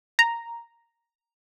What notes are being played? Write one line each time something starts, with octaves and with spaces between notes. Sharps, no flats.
A#5